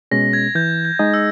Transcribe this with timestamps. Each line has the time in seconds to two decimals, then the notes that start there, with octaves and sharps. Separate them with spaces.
0.11 B2 G#3 C#4 A#6
0.33 G#6
0.55 E3 G6
0.85 G6
0.99 G#3 D#4 G#4 D#5
1.14 E6